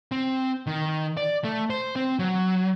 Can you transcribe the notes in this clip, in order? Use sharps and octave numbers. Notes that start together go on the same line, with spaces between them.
C4
D#3
D5
A3
C5
C4
F#3